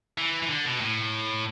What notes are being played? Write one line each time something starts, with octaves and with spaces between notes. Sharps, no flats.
E3
E3
D3
B2
A2